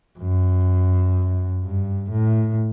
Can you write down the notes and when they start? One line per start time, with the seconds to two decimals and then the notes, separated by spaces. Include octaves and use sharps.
0.19 F#2
1.63 G2
2.10 A2